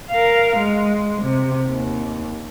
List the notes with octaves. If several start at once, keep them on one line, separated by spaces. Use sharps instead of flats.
A#4 F5
G#3
C3
D#2